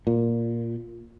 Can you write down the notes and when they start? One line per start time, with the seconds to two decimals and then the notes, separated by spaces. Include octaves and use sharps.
0.07 A#2